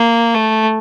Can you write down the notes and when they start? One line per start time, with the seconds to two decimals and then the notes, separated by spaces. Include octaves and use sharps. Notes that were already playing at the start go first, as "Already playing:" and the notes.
Already playing: A#3
0.34 A3